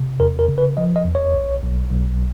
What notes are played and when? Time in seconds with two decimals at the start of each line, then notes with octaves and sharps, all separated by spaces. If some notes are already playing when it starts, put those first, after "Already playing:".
Already playing: C3
0.20 E2 A#4
0.39 A#4
0.48 C#3
0.58 B4
0.77 F3 D#5
0.96 D#5
1.05 E2
1.15 C#5
1.34 B1
1.62 B1
1.91 B1